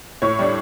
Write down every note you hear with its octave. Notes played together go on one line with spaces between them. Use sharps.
A2 C#5 C#6
G3 D4